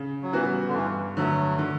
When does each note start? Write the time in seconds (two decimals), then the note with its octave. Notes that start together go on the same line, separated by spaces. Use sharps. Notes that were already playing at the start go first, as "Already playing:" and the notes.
Already playing: C#3
0.23 F#3
0.33 E3 G3 B3 F#4
0.67 D3
0.74 G2 E3
1.17 D3 F#3 A3
1.59 D3